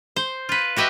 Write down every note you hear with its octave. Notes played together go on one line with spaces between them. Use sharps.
C5
F4 B4
F#4 G4 B4 D#5 E5